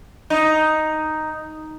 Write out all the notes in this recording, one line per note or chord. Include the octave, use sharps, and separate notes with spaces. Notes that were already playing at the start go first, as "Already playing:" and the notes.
D#4